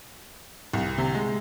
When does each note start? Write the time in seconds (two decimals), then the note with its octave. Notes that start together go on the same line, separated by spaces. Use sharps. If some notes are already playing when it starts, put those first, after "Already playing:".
0.73 C2
0.98 C3
1.15 G#3